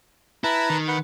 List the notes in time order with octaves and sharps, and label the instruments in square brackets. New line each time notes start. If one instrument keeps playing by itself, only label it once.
[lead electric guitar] E4 [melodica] B4 A5 A#5
[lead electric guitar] D#3
[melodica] B4 F#5